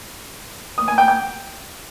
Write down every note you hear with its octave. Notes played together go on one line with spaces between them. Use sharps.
D#6
G#5
G5
G5